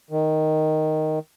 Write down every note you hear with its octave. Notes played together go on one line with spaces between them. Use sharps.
D#3